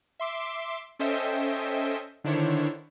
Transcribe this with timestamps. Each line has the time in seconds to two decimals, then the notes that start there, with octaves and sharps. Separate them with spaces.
0.20 E5 C6 D6
0.99 C#4 A4 C5 D#5 E5 G5
2.24 D3 D#3 D4 E4 C5 C#5